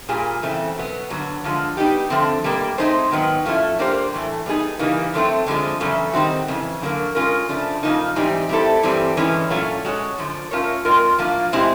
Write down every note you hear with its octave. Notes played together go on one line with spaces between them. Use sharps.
A#2 G3 G#4
F2 C#3 E3 A3 C4
B2 F#3 B3
G2 D3 F#3 B3
G2 D3 F3 G#3
G3 B3 D#4 G4
D3 F3 A3 C4
B2 G3 A#3
A3 C4 D#4 G#4 C5
G#2 D#3 F#3 B3
A2 F3 A3 C#4 E4
F3 A#3 D4 G4 C5
A2 E3 A3
G3 B3 D#4 G#4
C#3 E3 G3 A#3 D#4
D3 F#3 A3 C4
F2 D3 F3 G#3
E2 C#3 F#3 A3
D#3 G3 C4 D#4 F#4
F2 C#3 E3
F#2 D3 F#3 A#3
G#3 C#4 F4 A#4
C#3 F3 A3 D4
C#3 F3 A#3 D#4
G#2 E3 G3 C4 D#4
G3 C4 E4 A4
G2 E3 G3 C4
G2 E3 G#3 C#4
A#2 F#3 A3 C#4 F4
G#3 C#4 F#4 A4 C#5
F#2 D3 F3
A3 C#4 F4 A#4 C#5
G#3 C4 F4 A#4
A2 F3 A#3 D4 F4
B2 G#3 C4 E4 G4